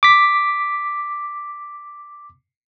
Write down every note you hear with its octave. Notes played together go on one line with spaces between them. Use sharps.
D6 B6